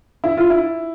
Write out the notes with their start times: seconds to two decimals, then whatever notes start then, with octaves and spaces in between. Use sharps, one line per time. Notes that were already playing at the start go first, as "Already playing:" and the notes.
0.24 E4
0.37 F4
0.50 E4